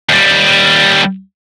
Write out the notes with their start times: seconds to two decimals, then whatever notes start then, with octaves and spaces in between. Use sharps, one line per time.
0.09 D#2 G3